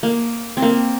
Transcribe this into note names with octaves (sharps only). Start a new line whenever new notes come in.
A#3
C4
A#3